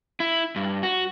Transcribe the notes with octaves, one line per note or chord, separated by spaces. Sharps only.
E4
G2
F#4